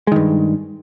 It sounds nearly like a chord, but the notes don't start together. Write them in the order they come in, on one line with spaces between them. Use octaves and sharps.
G#3 D#3 G2